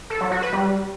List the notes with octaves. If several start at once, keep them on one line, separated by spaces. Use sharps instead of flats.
A4
F#3
F#4
B4
G3